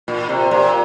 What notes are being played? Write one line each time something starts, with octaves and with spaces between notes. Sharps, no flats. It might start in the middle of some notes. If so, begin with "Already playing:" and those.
A#2
C3
A#2